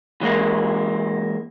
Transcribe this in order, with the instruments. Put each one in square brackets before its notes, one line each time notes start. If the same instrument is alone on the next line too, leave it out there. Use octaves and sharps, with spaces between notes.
[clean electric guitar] E3 G#3 A#3 E4